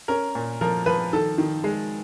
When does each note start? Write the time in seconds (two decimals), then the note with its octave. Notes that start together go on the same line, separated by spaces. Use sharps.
0.08 C#4 A#4
0.35 A#2
0.61 F3 A#4
0.86 F3 B4
1.13 D#3 A4
1.38 D#3
1.64 G#3